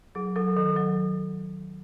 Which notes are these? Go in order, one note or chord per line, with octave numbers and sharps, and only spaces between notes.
F#3 G#4
F#3 A4
D#3 A4
F#3 A4